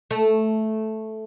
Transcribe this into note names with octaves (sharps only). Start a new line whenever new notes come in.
A3